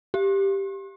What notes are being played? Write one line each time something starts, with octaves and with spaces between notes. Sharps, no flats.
G4